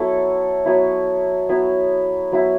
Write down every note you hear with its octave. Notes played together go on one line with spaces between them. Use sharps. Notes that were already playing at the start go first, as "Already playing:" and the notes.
Already playing: F#3 B3 E4 A4
F#3 B3 E4
F#3 B3 E4
F#3 B3 E4